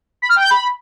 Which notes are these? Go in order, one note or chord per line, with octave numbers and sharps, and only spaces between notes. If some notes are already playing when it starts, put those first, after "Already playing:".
B5
F6
G5
G6
B5